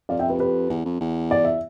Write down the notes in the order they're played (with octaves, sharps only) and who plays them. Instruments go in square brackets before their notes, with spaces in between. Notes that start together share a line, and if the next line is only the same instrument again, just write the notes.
[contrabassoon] F2 [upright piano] D5 F5
[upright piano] E5 G5
G4 B4
G4 B4
[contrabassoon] E2
F2
E2
[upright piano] D5
E5